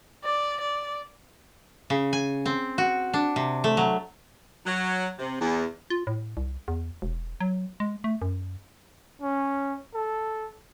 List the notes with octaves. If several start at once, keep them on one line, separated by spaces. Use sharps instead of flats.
D5
D5
C#3
G#5
C4
F#4
D4
C3
A3
F#3
F#3
C3
E2
F4
A2
C2
E2
E1
F#3
G#3
A3
F#2
C#4
A4